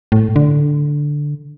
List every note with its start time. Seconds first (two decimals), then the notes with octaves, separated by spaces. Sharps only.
0.12 A2
0.36 D3